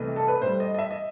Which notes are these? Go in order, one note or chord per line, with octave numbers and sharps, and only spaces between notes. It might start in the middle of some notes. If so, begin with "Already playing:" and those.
Already playing: C2 C3 E3 A3 D#5
A4
B4
A2 G3 C5
D#5
D#5
E5
D#5